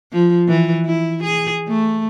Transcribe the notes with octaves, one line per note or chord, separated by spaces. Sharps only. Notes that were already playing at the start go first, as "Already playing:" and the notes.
F3
E3
E4
G#4
A3